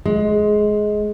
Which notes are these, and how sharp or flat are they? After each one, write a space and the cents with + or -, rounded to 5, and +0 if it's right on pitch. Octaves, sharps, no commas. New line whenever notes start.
G#3 +15